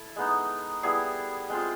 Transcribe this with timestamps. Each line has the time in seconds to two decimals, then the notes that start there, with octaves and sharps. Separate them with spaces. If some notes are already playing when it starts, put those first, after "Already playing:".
Already playing: E4 A4
0.16 G#3 B3 D#4
0.83 G3 B3 E4 G#4
1.50 G#3 C4 F4